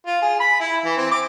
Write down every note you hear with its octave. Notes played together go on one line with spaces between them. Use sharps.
F4
G#4
B5
E4
E3
C4
D6